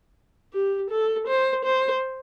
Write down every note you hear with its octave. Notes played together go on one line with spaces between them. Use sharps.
G4
A4
C5
C5